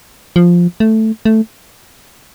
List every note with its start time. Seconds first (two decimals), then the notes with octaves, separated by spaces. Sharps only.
0.36 F3
0.80 A3
1.25 A3